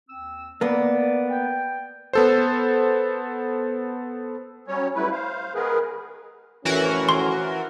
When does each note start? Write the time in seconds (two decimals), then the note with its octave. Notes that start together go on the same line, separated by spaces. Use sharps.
0.09 D#2 C4 E6
0.61 A#3 B3 D5
1.30 G5
2.13 B3 A4 C5
4.68 F#3 G3 C#4 C#5
4.95 F#3 G3 A3 E4 B4
5.12 C5 F5
5.54 D#3 G#3 B3 G#4 A#4 B4
6.65 F2 A2 E3 C#4 F#4 A#4
7.09 C6